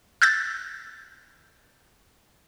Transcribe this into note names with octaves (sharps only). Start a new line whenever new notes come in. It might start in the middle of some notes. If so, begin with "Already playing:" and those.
E6 F#6 G6 A6